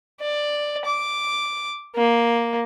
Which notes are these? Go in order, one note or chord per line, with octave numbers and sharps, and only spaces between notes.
D5
D6
A#3